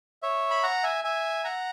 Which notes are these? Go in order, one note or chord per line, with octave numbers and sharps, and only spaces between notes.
C#5 E5
B5
F#5 A#5
E5 G#5
E5 G#5
F#5 A#5